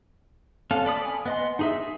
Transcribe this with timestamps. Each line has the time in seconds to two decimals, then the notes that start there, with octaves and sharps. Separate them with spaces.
0.71 C4 C#4 A4 F5
0.85 A4 D5 B5 D#6
1.05 G#5
1.26 B3 D#5 C6
1.59 D#4 G#4 E5
1.82 G#4